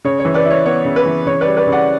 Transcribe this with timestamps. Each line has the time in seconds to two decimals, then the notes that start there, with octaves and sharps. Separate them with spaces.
0.05 C#3 C#5
0.20 C#5
0.25 E3
0.34 B4 D5
0.45 E4
0.50 C#5
0.66 B3 C#5
0.85 C#3
0.96 B4
1.06 E3
1.26 C#3 C#5
1.41 G3 B4 D5
1.57 B4 D5
1.67 C#3
1.72 D5 F#5